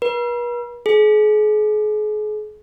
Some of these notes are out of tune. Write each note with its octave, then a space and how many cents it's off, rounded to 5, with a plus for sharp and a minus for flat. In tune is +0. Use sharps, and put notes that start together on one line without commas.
B4 -45
G#4 +40